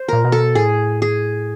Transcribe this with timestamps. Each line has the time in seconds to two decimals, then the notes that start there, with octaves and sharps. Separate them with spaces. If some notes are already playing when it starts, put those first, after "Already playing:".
Already playing: C5
0.08 A#2 A#4
0.25 B2
0.32 A4
0.55 A2 G#4
1.02 G#4